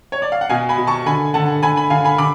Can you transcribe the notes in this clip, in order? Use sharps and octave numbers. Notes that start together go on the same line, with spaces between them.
C#5
D5
F5
F#5
B2 F5 G#5
G#5 B5
B2
A5 C#6
D3 G#5 B5
D3 F#5 A5
D3 G#5 B5
G#5 B5
D3 F5 G#5
G#5 B5
D3 B5 D6